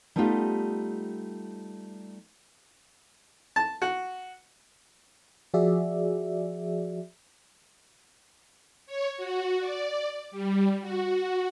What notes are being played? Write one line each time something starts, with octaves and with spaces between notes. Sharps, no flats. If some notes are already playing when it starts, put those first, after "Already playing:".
G3 A3 B3 D#4 F4 G4
A5
F#4
F3 F#4 G#4 D5 E5
C#5
F#4
D5
G3
F#4